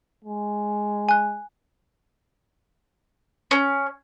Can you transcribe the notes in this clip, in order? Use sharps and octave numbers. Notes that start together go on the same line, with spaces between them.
G#3
G#5 F#6
C#4